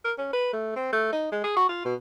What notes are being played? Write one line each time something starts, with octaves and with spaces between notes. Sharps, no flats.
A#4
C#4
B4
A3
C4
A3
D#4
G#3
G#4
F#4
F4
B2